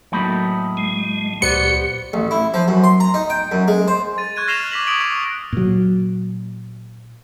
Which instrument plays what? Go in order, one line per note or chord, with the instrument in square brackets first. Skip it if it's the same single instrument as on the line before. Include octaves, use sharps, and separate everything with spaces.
[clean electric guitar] A2 D#4 B5 [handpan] F#3 A3 A#3
[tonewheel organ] G#3
[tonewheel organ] C#2 G4 [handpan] A#2 C5 D5 [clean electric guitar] B3 [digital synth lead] C#7
[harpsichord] A1
E4
F3
F#2
C6
A#5
D#4
G5
F#2
G#3
C5
[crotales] A6 D#7
C#6 F#6 G#6 D#7
F6 A#6 C7 E7 F7 G7
D6 B6 F#7
D6 D#6 D7 F#7
C#6 E6 D7
[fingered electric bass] A#2 F#3